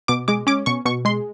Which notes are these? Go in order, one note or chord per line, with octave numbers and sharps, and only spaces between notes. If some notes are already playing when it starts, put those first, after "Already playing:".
B2 D6
G#3 D6
C#4 D6
B2 C#6
B2 C#6
G#3 C6